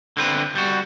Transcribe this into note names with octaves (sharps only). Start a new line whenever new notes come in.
D3 C4 B4
G3 F#4